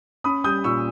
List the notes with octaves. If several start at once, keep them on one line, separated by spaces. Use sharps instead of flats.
C#4 B5 D#6
G3 D#6 G6
A#2 C#6 E6